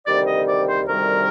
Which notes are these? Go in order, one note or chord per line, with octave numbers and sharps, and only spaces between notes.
D2 C3 D#3 G3 D5
D#5
D5
C5
D2 C3 D#3 G3 A#4